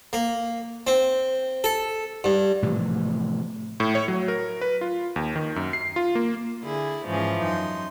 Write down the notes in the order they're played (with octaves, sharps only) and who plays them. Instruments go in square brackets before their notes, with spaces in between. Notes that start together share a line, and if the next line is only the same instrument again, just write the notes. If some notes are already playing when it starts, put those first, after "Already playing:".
[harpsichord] A#3
C4
A4
G2
[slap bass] A2 C3 E3 F3
[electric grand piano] A2
C#5
F#3
A#4
B4
F4
D#2
D#3
F#2
C7
F4
A#3
[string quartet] D3 E4 G#4
G#2 E3 F3 C#4 G#4
F#2 D#4 C6